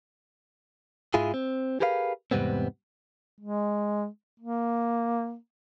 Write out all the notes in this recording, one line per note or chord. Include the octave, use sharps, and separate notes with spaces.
G#2 G#3 E4 F4 G#4
C4
G4 G#4 A#4 B4 D5 F5
E2 G#2 C3 G3 B3 C4
G#3
A#3